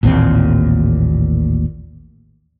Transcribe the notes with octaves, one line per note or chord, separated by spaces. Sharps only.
A1 D#2 A#2 C4